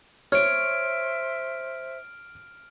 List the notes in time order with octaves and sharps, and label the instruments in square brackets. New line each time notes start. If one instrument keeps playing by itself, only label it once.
[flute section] C5 E5 [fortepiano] C#5 [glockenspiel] F6 D7